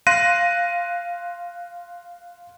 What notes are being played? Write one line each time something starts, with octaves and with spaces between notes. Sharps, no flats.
F5 C6 F#6 A#6 D#7